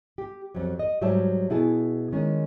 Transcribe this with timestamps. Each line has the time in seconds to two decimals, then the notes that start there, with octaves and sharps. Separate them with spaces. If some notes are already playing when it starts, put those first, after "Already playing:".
0.18 G4
0.55 F2 F#3
0.79 D#5
1.01 G#2 F#3 G3 C#5 E5 A5
1.50 B2 E4 G#4 A5
2.12 D#3 G#3 C#4